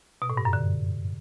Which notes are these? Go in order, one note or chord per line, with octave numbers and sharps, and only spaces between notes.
B2
A2
G2
F#2
D3